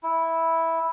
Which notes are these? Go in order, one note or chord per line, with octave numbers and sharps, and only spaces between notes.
E4